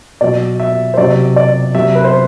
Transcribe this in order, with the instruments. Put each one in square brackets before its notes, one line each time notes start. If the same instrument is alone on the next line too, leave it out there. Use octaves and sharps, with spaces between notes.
[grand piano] B2 F#3 D5
E5
C5
C3 F#3 D5
D5
C3 F#3 E5
B4
C5